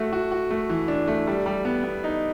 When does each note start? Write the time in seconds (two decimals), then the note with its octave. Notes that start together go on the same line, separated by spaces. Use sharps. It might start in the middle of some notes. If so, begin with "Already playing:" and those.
Already playing: A3 F#4
0.13 F#4
0.32 F#4
0.51 A3
0.70 E3
0.88 D4
1.08 A3
1.27 G3
1.46 G3
1.65 B3
1.84 B3
2.04 D#4